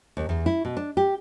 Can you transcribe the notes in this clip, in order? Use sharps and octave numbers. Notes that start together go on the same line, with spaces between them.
D#2
E2
E4
B2
D4
G4